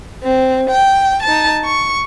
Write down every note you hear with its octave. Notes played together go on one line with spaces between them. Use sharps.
C4
G5
D#4 A5
C#6